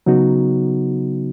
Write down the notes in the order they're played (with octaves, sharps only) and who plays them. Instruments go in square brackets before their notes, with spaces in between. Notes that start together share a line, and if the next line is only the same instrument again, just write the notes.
[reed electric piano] C#3 F#3 B3 D#4 F#4